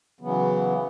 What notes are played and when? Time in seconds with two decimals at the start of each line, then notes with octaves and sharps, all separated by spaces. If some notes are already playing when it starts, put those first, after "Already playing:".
0.21 C#3 E3 F#3 B3